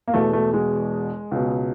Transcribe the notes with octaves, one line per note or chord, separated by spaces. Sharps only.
A#3
E1 E2 B2 A3
A3
G#3
C#2 B2